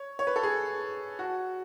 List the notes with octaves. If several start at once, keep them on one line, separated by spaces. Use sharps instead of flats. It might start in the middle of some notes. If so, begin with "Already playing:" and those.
Already playing: C#5
C#5
B4
A4
G#4
F#4